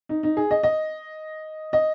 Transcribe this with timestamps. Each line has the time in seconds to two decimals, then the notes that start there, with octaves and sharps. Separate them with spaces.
0.09 D#4
0.23 D#4
0.37 G#4
0.51 D#5
0.63 D#5
1.73 D#5